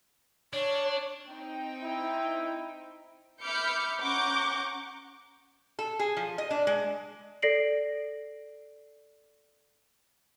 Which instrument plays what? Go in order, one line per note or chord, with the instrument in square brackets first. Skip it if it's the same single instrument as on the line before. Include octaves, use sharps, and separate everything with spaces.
[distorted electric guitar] D4 [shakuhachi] C#5
[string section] C4 D#4 G5
[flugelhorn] E4
[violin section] E5 B5 D6 F6 G6 C#7
C#4 F#5 A#5 C#6 D6 G6
[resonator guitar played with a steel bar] A4
G#4
F3
D#5
D4
G#3
[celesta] A4 D5 A#6 C7 D7 F#7